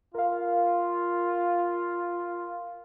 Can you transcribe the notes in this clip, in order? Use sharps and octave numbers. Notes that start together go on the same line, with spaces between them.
F4 A#4 F5